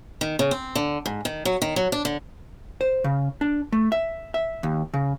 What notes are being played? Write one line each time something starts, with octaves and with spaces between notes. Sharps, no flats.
D#3
C#3
C4
D3
G#2
D#3
F#3
D#3
F#3
D4
D3
C5
C#3
D4
A3
E5
E5
D#2
C#3